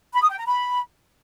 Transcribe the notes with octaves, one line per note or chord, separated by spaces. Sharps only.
B5
D#6
G5
A#5
B5